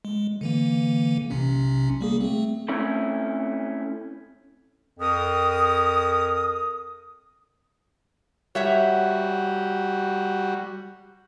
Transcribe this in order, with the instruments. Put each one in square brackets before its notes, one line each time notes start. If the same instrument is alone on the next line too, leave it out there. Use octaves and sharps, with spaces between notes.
[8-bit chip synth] G#3
D3 E3 A#3
B1 C3 C#4
G3 A#3 G#4
A3 C4
[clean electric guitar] A3 C4 C#4 E4 A4 B5
[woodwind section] F2 A#4 D#6
[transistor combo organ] G3 F#4 [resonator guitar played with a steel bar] C#5 E5 F#5